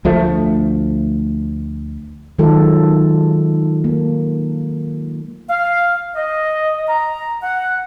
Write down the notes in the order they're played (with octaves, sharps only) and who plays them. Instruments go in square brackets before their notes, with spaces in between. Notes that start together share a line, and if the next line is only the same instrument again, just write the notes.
[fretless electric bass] D2 F3 A3
[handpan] D#3 F#3 G#3 F4 A4
A#3
[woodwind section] F5
D#5
A#5
F#5